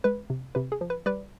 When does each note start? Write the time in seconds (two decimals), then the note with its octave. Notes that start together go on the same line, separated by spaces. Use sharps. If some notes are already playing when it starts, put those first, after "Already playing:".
0.04 G#3 B4
0.30 C3
0.55 C3 B4
0.72 G#4
0.81 F3
0.90 B4
1.06 G3 B4 D5